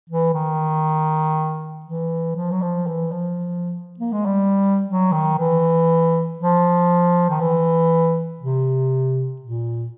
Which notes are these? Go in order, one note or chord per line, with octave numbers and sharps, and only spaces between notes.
E3
D#3
E3
F3
F#3
F3
E3
F3
A#3
G#3
G3
F#3
D#3
E3
F3
D#3
E3
C3
A#2